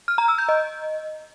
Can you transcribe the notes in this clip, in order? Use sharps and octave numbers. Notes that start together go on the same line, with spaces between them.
F6
A#5
E6
G6
D#5